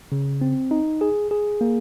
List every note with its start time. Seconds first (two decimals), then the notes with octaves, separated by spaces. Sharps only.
0.12 C#3
0.41 C4
0.71 D#4
1.01 G#4
1.31 G#4
1.61 A#3